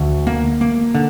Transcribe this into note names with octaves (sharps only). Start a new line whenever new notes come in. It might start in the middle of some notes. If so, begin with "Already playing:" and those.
Already playing: D2
A#3
A#3
D3